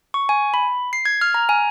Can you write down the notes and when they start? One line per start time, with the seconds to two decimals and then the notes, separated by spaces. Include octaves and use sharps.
0.14 C#6
0.29 G#5
0.54 B5
0.93 C7
1.06 G#6
1.21 F6
1.34 A#5
1.49 G#5